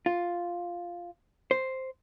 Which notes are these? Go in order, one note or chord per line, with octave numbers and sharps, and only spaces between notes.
F4
C5